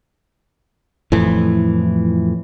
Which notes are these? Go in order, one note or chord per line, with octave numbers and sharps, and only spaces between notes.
F2 A2 E3